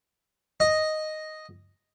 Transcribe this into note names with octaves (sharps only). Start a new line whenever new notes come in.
D#5